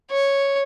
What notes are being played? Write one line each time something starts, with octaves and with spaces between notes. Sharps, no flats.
C#5